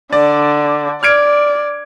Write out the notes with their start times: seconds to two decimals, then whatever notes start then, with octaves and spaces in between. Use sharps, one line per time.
0.12 D3 D5
1.03 D5 F6 G#6 D7